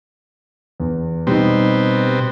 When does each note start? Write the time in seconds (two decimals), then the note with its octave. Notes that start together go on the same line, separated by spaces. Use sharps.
0.80 E2
1.27 B2 G3 C4 D#4